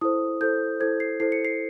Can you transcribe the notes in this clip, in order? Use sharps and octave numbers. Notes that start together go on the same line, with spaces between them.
E4 A4 C5 D#6
E4 A4 C5 G6
E4 A4 C5 G#6
C7
E4 A4 C5 C7
C#7
C7